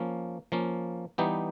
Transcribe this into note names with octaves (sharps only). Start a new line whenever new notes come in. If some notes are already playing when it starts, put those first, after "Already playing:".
Already playing: F3 A#3 C#4
F3 A#3 C#4
E3 G3 B3 D#4 G4